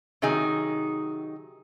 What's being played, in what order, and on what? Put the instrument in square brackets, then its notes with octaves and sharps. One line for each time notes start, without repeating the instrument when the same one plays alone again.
[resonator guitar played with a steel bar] C3 D#3 F#3 D#4 G#4